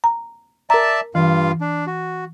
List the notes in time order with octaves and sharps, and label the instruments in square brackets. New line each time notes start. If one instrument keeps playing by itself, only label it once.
[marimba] A#5
[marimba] A#4 A#5 [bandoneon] D5 E5 A5
[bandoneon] G2 F4 F5 [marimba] E3
[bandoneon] D4
F#4